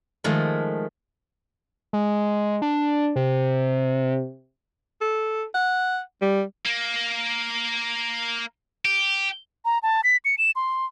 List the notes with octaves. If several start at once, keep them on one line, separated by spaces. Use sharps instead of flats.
D#3 F3 G#3 A3
G#3
D4
C3
A4
F#5
G3
A#3
G4
A#5
A5
B6
C#7
E7
C6